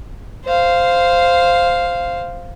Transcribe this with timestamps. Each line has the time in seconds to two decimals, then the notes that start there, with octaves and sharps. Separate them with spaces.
0.45 C5 F5